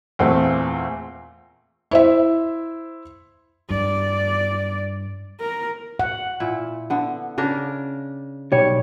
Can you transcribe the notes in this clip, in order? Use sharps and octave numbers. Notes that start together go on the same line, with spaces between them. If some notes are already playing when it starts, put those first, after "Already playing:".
E2 A#2 A3 C4
E4 C5 E5
G2 D5
A#4
F#5
A#2 E4
D3 B3
C#3 D4 A#4
B1 G3 C#5